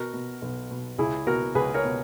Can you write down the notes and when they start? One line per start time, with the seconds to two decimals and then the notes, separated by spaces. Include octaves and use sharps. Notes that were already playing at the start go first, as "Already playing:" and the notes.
Already playing: B2 F#4 A#4
0.13 B2
0.42 B1
0.71 B2
0.98 C#2 E4 G#4
1.27 B2 F#4 A#4
1.55 C#2 G#4 B4
1.74 A#4 C#5
1.84 B2